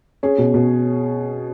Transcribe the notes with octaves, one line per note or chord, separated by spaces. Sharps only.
C#4 G#4
B2
B2